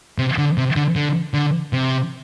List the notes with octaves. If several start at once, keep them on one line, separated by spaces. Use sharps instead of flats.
C3
D3
C3
D3
D3
D3
C3